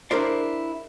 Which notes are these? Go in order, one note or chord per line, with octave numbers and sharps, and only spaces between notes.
D4 E4 G#4 A#4 C5 D5